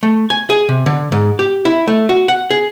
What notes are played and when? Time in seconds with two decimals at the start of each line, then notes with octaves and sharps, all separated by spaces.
0.03 A3
0.30 G#5
0.50 G#4
0.69 C3
0.86 D3
1.12 G#2
1.39 G4
1.65 E4
1.88 A3
2.09 F#4
2.28 F#5
2.50 G#4